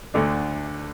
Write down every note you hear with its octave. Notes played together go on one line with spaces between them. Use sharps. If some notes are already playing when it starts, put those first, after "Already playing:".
D2 D3 A3 D4